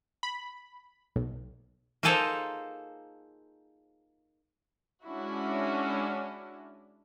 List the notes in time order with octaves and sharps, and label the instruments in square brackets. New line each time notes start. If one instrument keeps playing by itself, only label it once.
[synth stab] B5
B1
[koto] A#3 D#4 F4 G#4 A4 C5
[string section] G#3 C#4 D4 E4 F#4